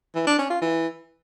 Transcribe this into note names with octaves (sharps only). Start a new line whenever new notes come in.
E3
D4
C#4
F4
E3